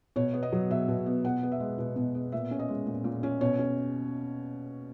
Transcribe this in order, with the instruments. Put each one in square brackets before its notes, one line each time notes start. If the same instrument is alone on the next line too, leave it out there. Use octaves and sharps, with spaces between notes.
[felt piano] B2 C#5
B3
D#5
F#3
B2 E5
B2
B3
B2 F#5
B3
E5
G#3
B2
B2
B3
A#2 E5
C#4
D#5
G#3
A#2
A#2
C#4
B2 C#5
C#4